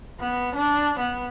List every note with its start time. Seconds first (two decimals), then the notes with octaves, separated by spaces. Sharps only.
0.20 B3
0.55 D4
0.99 B3